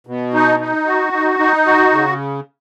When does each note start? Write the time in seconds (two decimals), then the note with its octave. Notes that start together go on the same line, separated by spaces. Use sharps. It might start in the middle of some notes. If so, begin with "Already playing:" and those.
0.07 B2
0.34 D#4
0.60 D#4
0.86 F#4
1.13 D#4
1.39 D#4
1.66 F#4
1.92 C#3